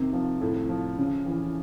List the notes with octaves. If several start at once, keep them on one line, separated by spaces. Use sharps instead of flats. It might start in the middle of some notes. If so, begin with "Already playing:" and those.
Already playing: C3 D#3
F3
A2
F3
C#3
E3